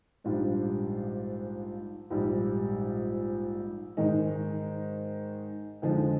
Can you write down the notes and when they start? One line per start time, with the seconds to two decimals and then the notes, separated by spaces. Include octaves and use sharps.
0.24 A#1 G#2 G3 D4 F4
2.10 A#1 G#2 G3
3.97 G#2 D#3 G#3 D#4
5.82 F2 D3 F3 G#3 D#4